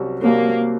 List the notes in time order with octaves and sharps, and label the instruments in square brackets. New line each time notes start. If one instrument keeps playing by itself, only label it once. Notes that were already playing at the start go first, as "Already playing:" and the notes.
Already playing: [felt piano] C2 C3 F#3 C#4 F#4
[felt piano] C2 C3 F#3 C#4 F#4 [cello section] A#3